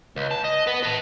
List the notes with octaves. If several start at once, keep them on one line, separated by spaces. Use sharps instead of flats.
C#2
A5
D#5
B3 B4
B4 A5